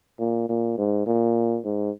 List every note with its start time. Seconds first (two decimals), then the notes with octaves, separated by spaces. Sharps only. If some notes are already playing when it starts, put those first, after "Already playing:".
0.19 A#2
0.49 A#2
0.78 G#2
1.06 A#2
1.64 G#2